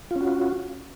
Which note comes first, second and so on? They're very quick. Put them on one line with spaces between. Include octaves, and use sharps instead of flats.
F4 C#4 F#4